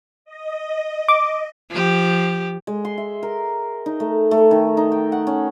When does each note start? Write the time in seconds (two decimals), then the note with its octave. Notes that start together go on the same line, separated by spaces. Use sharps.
0.25 D#5
1.08 D6
1.70 F3 G4
2.67 G#3
2.85 C6
2.98 E5
3.23 A#4
3.86 D#4
4.00 A3
4.31 A3
4.51 D#3
4.77 D#4
4.92 G5
5.12 F#5
5.27 C#4